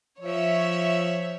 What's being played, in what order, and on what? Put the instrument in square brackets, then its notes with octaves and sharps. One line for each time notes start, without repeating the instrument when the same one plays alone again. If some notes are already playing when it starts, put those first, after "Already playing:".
[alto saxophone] F3 [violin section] C#5 E5